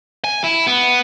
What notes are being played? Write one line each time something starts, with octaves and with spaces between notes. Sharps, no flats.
G#5
E4
B3